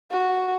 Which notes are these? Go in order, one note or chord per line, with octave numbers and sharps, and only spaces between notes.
F#4